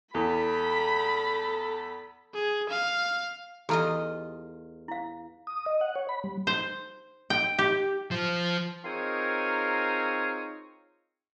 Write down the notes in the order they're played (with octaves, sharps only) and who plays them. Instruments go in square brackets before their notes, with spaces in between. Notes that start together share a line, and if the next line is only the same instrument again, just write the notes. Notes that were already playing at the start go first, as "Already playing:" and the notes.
[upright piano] E2 [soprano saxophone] A4 [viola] B5
[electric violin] G#4
F5
[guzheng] E2 F4 D#5 [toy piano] G4 A4 A#5
[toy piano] E4 F5
[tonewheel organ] D#6
D#5
F#5
C#5
B5
G3
[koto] C5
G5
G4
[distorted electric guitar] F3
[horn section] C4 D#4 F4 G#4 A#4 C#5